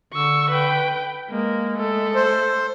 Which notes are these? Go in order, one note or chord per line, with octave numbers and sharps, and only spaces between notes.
D3 C#6 E6
B4 G5
G#3 A#3
A3 A4
C5